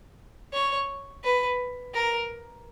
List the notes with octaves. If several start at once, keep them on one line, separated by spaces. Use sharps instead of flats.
C#5
B4
A#4